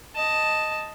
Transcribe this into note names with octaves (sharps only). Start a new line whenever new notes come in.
D#5 A5